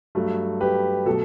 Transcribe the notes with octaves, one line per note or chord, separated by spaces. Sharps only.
G2 F#3 A3
G4 B4
B2 F#3 A3 A4